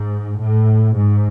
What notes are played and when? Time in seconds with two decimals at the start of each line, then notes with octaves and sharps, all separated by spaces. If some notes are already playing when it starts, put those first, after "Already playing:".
Already playing: G#2
0.40 A2
0.98 G#2